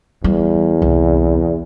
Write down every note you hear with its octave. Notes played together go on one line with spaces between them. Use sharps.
E2 G3
C2